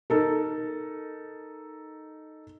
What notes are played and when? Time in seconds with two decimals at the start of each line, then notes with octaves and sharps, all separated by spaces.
0.10 D#4 A4 A#4